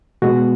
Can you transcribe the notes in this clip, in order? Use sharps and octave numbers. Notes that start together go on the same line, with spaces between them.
B2 G#3 B3 F#4